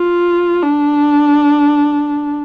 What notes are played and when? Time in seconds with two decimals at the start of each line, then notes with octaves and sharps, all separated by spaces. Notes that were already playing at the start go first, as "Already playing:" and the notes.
Already playing: F4
0.63 D4